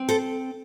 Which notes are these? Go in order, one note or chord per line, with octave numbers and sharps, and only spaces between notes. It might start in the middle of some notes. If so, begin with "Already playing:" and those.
Already playing: C4
A4 C5